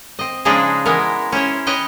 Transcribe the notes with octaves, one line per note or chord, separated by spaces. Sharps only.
C4 D#5
C#3 F3 G#3 D4 D#4 G#4
E3 G#3 B3 A#4
C#4 E4 C5 C#5
B4 C#5 D#5 G5